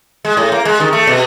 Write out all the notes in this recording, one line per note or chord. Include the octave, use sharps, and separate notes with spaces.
G#3
A2
A#3
G#3
D#3
A3
B2